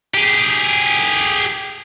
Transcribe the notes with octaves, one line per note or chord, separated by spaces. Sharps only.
G4 G#4